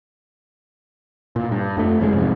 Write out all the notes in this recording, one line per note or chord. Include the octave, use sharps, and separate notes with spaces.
A#2
G2
F2 A3
F#1 F#2 C#3 G#3
C2 F2 G#2